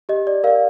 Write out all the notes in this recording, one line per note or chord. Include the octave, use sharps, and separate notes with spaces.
G4 D#5
D5
A#4 D5 F5